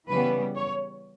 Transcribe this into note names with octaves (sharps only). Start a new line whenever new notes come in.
C#3 E3 G3 B3 B4
C#5